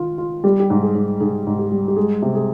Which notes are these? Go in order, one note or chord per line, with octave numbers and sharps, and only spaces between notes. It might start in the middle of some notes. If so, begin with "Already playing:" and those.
Already playing: D#3 F4
F4
G3 G4
G4
G#2
G#4
G#2
G#2 G#4
G#2
G4
G3
G4
G#3 G#4
C3
G#4